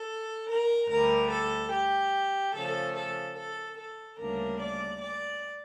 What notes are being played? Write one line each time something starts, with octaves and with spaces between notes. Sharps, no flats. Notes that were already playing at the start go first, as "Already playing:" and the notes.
Already playing: A4
A#4
D2 D3 G3 A#4
A4
G4
C#3 F3 A3 A4
A4
A4
A4
D2 C#3 G3 A#3 D4 A#4
D5
D5